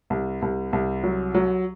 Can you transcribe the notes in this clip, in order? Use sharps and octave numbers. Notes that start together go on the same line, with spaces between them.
C2
C2
C2
F#3
F#3